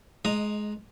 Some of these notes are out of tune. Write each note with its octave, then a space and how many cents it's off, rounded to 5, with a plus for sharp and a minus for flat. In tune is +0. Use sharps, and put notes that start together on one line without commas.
G#3 +20 D#5 +0 A#5 +0